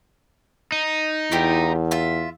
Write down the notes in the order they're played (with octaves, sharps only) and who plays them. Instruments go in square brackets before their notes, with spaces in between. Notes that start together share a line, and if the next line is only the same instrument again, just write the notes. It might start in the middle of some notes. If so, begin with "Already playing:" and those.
[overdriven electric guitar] D#4
[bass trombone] E2 [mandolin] E4 F4 G4
[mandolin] F4 E5